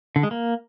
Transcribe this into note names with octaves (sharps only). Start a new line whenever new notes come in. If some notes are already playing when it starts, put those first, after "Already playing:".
D3
G#3
A#3